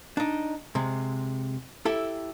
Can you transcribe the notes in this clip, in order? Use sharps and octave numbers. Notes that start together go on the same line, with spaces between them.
D4 D#4
C3 G#3
E4 G4 A4